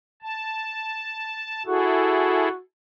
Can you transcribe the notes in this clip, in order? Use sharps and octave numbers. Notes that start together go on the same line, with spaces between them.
A5
E4 F#4 G#4 A4